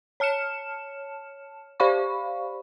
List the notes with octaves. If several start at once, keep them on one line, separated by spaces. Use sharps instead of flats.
C#5 A5 F6 C#7 E7
G4 C5 D5 F5 B5 C#6